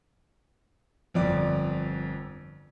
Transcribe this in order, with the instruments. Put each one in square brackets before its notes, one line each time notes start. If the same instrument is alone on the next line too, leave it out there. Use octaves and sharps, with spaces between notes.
[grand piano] G1 F2 D5